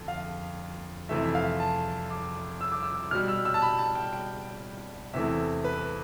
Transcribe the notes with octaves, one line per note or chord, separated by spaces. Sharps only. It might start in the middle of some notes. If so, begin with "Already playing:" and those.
Already playing: F2 D3
F5
F2 C3 E3 A3 E5
E5
F5
A5
D6
E6
D6
E6
B2 G3 F6
E6
E6
A5
B5
A5
G5
G5
E2 C3 E3 A3 E5
B4